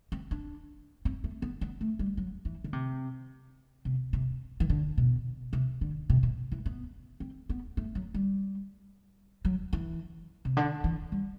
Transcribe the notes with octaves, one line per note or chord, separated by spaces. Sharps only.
C4
D4
C4
A3
B3
B3
A3
G3
F#3
E3
D3
C3
C3
C3
E3
D3
B2
C3
D3
C3
B2
E3
B3
C4
B3
A3
F#3
G3
F#3
E3
C3
D3
E3
G3